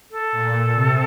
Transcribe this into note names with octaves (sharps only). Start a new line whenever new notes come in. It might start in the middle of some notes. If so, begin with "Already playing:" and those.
A4
A#2
C3